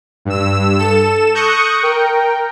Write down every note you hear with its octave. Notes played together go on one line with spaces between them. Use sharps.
G2 E6
A4 E7
C#6 D#6 F#6 G6 A#6 C#7
A#4 G5